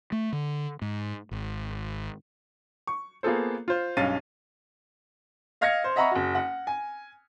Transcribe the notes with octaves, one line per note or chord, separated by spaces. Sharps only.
A3
D3
G#2
G#1
C#6
A#3 B3 F4 G#4 A4 C5
F4 C5
B1 G2 C#4 F5 A6 D#7
D#5 F5 F6 G#6 A#6 C#7
C5
D#5 E5 F#5 A#5 B5 C#6
F#1 F#4
F#5
G#5